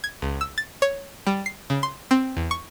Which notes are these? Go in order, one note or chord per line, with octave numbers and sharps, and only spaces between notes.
G#6
C#2
E6
A6
C#5
G3
C7
C#3
C6
C4
E2
C#6